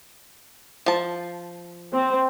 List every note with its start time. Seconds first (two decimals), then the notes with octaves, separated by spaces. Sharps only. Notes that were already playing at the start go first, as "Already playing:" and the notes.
0.86 F3 A5
1.93 C4